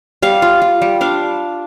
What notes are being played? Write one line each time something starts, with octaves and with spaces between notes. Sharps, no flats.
G3 F5
F4
F4
G3
D4 F5